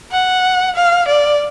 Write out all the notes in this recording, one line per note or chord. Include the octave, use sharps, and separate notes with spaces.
F#5
F5
D5